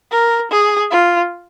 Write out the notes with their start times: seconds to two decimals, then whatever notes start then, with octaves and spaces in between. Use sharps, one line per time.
0.12 A#4
0.51 G#4
0.91 F4